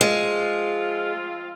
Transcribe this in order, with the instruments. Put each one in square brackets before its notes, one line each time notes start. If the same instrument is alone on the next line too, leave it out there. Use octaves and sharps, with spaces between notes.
[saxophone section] F3 C4 F4 [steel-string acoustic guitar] G#3